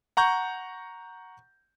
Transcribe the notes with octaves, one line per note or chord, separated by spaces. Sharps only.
F#5 A#5 C#6 G6